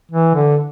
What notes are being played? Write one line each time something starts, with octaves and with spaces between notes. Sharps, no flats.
E3
D3